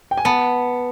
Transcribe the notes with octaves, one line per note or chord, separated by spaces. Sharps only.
G5
G#5
B3 A5